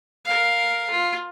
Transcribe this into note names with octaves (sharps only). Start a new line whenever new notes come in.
A#4 F5
F4